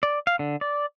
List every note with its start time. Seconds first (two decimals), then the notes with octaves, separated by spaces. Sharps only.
0.03 D5
0.27 F5
0.39 D3
0.61 D5